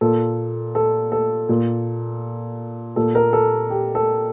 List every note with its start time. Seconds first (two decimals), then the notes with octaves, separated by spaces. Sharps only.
0.01 A#2 A4
0.75 A4
1.12 A4
1.49 A#2
2.96 A#2 A4
3.15 A#4
3.33 A4
3.70 G4
3.95 A4